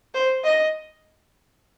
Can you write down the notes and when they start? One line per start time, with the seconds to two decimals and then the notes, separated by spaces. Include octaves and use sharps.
0.14 C5
0.44 D#5